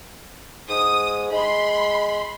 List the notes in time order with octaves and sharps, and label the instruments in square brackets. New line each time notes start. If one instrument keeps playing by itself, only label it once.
[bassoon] G#2 [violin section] D#6
[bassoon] G#3 [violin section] B5 C6